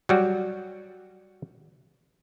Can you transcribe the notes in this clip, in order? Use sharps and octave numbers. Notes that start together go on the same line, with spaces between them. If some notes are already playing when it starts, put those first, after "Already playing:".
F#3 G3 F#4